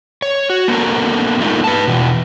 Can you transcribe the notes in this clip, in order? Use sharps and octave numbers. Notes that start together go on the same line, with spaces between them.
C#5
F#4
A#3 B3 D4 A4 A#4
G#3 A3 D#4 F4 A#4
B4 A5
B2 E3